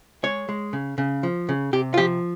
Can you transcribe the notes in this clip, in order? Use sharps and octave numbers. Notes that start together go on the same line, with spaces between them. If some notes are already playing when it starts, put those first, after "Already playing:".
G#3 C#5
G#3
C#3
C#3
F3
C#3
C3 G4
F4
F3 G4